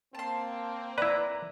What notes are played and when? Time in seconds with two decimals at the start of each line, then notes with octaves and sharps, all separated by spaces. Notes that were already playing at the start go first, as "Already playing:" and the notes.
0.15 A#3 C4 A5 C6
0.98 E4 B4 D5 A#5